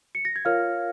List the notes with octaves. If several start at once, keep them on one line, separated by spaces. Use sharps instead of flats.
C#7
A#6
G#6
F4 A#4 C#5 F5 F6